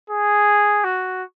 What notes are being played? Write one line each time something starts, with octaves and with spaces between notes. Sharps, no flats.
G#4
F#4